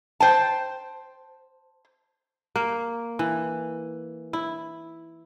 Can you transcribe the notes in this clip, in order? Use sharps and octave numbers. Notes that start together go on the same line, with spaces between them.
C5 G5 A5
A#3
E3
E4